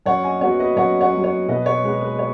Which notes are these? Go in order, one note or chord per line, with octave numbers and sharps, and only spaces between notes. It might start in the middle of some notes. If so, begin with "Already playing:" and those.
F#2 C#5 F#5
D#5 G#5
F#3 B3 C#5 F#5
B4 D#5
F#2 C#5 F#5
C#5 F#5
F#3 B3
C#5
B2 B4 D#5
C#5
G#3 B3 B4
B4
C#5